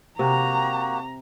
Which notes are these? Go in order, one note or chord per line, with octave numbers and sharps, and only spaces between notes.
C3 A#3 F#4 G4 A#5